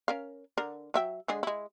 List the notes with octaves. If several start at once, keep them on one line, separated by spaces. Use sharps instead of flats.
C#4 A#4 F5
D3 A#4
F#3 E5 G5
D3 G#3 G#4
G#3 E4